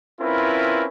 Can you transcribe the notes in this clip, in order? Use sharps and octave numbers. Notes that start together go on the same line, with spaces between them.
C4 C#4 E4 F4 A#4 B4